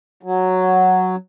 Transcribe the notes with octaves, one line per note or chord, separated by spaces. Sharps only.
F#3